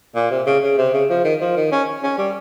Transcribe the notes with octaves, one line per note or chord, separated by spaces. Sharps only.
A#2
C3
C#3
C#3
C3
C#3
F3
D#3
F3
D#3
C#4
C#4
G3